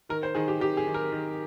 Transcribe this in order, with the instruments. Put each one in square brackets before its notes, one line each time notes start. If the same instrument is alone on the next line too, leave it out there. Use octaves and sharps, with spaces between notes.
[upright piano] D#3 A#4
C5
D#3 G#4
G4
D#3 G4
G#4
D#3
A#4
D#3